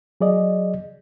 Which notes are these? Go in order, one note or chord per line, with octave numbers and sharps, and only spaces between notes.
F#3 G#4 D5 D#5